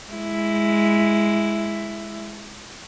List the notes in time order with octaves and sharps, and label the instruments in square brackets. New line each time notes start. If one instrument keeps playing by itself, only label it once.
[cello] G#3 E4